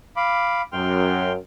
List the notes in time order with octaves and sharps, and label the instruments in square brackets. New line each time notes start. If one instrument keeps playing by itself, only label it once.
[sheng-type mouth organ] F5 B5 D6
[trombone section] F#2 [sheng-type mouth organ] G5 C6 F6